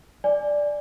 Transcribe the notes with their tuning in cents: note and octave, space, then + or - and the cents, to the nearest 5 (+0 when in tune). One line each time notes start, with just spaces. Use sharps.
D5 +0 G#5 +0